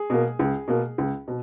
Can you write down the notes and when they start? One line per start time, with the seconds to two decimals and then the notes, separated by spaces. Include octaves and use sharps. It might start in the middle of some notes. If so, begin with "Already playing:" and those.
Already playing: G#4
0.10 B2 A#3
0.39 C#2
0.68 B2 A#3
0.98 C#2
1.28 B2